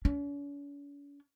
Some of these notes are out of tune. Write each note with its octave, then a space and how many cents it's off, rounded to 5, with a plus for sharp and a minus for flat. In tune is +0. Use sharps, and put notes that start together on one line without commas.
C#4 +45